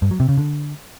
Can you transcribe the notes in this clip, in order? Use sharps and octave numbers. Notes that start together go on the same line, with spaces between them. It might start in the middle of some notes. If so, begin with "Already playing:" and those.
G2
F#3
C3
C#3
D3